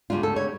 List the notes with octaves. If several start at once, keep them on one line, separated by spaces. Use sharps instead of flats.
D2 C#3 G3 D4 F4
A4
C#5